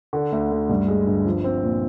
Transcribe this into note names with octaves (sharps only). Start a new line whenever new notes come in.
D3
D2
D2
G2
G#3
G1
F3
C4
A#2